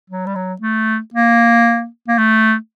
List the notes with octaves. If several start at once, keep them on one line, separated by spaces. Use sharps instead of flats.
F#3
G3
F#3
A3
A#3
A#3
A3